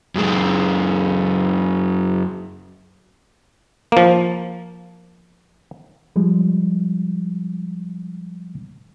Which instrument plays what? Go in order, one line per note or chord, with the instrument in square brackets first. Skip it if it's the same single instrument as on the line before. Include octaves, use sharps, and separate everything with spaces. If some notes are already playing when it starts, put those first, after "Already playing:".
[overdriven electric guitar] F#2 G#3
[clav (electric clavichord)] F3 A#3
[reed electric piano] F3 G3 G#3